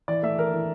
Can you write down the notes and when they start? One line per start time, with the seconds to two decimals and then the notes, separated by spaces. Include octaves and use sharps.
0.08 E3 D5
0.23 A3 E5
0.38 E3 A#4
0.53 E3